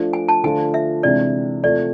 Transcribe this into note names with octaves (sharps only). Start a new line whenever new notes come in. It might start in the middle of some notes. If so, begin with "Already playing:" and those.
Already playing: F3 A3 D4
G#5
A5
D3 F3 A3 D4 F4 G#5
E5
C3 E3 G#3 D4 D5
C3 F3 A3 D5